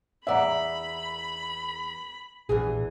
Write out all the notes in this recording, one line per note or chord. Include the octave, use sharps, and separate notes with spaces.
E2 D5 E5 F#5 A#5 B5
A#1 E2 E3 G#4